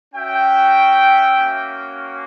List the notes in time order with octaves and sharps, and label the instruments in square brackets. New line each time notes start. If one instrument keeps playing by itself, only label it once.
[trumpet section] C#4 F#4 E5 G5
A#3 C#4 F#4